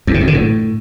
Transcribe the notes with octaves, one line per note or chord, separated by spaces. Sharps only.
E2
C3
F2
D3
A2